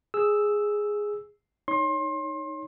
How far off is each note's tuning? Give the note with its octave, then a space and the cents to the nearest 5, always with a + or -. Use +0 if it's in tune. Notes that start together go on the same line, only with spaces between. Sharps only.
G#4 +0 E6 +0
D#4 +0 C#5 +0 C6 +30